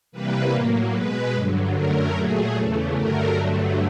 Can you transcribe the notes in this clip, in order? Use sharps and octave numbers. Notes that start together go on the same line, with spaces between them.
C3 E3 G3 A#3 B4
A2 F#3 A#3
B2 G#3 B4
G2 D3 F#3
F#2 D3 F#3 A3 A#4
A#2 F#3 A3 G#4
E2 C#3 E3 A3
G2 D3 F#3 A3 A#4
G2 D3 F#3 A3